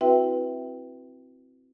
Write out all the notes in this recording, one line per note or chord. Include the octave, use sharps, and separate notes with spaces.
C4 E4 F#4 B4 E5 G5